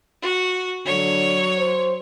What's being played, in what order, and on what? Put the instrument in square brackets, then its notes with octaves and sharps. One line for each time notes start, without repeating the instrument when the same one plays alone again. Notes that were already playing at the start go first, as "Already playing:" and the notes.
[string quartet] F#4
[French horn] D3 [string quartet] F#3 C#5
[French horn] C5